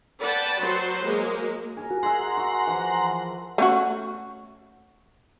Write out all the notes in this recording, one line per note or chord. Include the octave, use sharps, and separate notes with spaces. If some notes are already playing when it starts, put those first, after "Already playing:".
B4 D5 F#5 G5 A5
F#3 F#4 B4 C5
F#3 G#3 A#3
G#4 A#4
F#4
G#4 E5 F#5 A#5 C6
F#4
E3 F3
A3 C#4 F#4